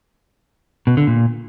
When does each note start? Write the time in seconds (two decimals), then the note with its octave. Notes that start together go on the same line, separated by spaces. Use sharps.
0.87 B2
0.97 D3
1.07 A#2